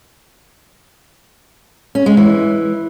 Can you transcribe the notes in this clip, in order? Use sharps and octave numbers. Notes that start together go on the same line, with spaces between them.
C#4
G#3
E3